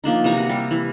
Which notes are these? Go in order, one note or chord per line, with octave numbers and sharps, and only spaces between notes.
F3 A#3 D4 D#4
C3 E3 A#5 C#6
F#4
G3
E3